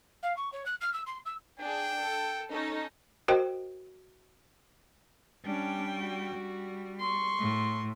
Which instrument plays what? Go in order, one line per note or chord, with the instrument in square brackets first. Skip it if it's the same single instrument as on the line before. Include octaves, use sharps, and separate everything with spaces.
[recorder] F5
C#6
C#5
F#6
F6
E6
C6
E6
[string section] D4 G#4 [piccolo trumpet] G5
[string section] A4
C#4 D#4 A4
[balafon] F#4 A#4 C5 D#5 G5
[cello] G3 G5 [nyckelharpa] C#4 D4
[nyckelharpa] F#4
[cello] G3
[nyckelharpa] C6 C#6
[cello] A2